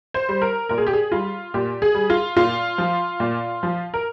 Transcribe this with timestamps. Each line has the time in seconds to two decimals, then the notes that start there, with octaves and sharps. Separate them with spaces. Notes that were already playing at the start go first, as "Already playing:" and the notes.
0.14 C5
0.29 G3
0.42 A#4
0.69 A#2 A#4
0.78 G#4
0.87 G4
0.93 G#4
1.12 G3 F4
1.54 A#2 G4
1.82 G#4
1.95 G3
2.10 F4
2.36 A#2 F4
2.78 F3
3.20 A#2
3.63 F3
3.94 A#4